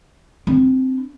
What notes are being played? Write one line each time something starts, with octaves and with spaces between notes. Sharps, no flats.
C4 D4